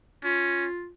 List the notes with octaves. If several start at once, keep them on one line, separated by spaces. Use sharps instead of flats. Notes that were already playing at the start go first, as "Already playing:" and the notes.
C#4 F4